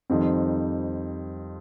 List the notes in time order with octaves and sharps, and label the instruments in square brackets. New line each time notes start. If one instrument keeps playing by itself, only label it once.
[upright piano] F2 D#3 G3 C4 D#4